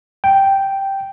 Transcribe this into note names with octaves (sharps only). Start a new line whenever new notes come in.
G5